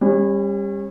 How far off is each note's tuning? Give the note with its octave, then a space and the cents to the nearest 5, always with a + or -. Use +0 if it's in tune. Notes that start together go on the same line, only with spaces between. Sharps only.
G3 +30 C#4 -30